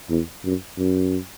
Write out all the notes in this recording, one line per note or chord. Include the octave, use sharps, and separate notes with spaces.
E2
F#2
F#2